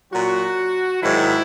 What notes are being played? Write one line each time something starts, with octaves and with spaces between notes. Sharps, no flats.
A#2 F#3 F#4
G#2 D#3 F#3 E4